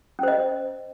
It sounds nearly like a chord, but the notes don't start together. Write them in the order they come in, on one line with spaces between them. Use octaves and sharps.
C#4 C5 D#5